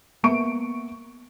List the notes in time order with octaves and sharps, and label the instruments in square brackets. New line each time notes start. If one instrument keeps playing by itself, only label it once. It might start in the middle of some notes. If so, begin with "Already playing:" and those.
[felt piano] A#3 B3 E5 C#6 D7